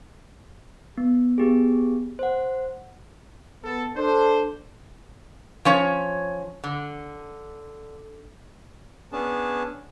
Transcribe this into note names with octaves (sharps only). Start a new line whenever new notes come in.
B3
B3 G4 G#4
C5 F#5
B3 A4
D4 A4 C5
F3 C#4 C#5
D3
B3 C#4 D4 G#4 A5